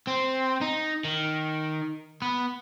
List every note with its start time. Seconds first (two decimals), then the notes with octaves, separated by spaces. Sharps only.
0.07 C4
0.61 D#4
1.05 D#3
2.22 B3